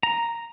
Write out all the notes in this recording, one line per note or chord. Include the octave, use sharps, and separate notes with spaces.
A#5